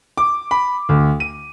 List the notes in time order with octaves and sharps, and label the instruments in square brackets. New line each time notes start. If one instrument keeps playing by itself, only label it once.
[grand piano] D6
B5
D2
D#7